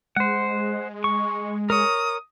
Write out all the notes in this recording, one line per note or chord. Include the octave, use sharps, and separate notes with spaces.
G#3 C5 F#5
C#6
A#4 C#5 D#6